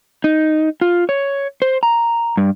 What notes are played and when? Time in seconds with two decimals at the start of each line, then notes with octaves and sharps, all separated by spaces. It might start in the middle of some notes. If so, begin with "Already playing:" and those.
0.24 D#4
0.81 F4
1.09 C#5
1.62 C5
1.83 A#5
2.37 G2